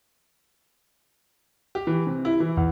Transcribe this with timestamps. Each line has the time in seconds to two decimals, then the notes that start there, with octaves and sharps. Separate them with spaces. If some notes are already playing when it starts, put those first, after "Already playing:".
1.75 G4
1.87 E3
2.07 C3
2.25 E4
2.40 E3
2.57 E2